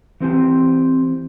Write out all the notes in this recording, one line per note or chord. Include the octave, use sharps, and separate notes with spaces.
E3 C4 G4 G#5